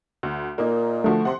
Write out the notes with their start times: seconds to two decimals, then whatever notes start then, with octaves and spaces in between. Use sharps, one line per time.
0.23 D2
0.58 A#2 A#3 D#4
1.04 D3 F3 A3 F#4
1.25 C3 F#5 C6